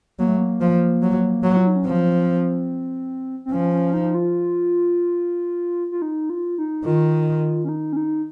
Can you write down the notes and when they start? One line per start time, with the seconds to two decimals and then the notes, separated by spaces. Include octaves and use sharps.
0.19 F#3 A#3
0.28 A3
0.37 A#3
0.61 F3
1.02 F#3
1.43 F#3
1.57 F4
1.67 D#4
1.76 C#4
1.85 F3 C4
3.45 C4
3.52 F3 C#4
3.73 C#4
3.93 D#4
4.15 F4
5.92 F4
6.02 D#4
6.30 F4
6.58 D#4
6.85 D#3 F4
7.65 C#4
7.69 D#4
7.93 C#4
7.97 D#4